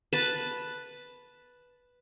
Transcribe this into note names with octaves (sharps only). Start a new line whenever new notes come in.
B4 A5